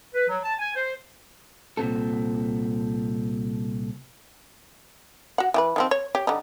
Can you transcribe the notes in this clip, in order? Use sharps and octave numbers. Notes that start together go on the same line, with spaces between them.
B4
F#3
A5
G#5
C5
C2 A#2 C4 A4
F#4 F#5
E3 G4 B4
D#3 F3 C4
C#5
G4 C#5
D3 G3 D#4